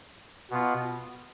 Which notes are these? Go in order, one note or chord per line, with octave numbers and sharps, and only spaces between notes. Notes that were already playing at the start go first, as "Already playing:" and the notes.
B2 B3 F4